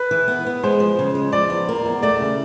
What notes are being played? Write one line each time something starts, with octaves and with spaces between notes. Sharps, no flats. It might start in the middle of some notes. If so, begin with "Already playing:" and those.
Already playing: B4
E3
B3
B3
G#3 C5
F3
C#3
G#3
F3 D5
E2
A#3
E2
A3 D5
C#3